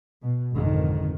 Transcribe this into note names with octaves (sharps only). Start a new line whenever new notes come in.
B2
G#1 F2 D3 D#3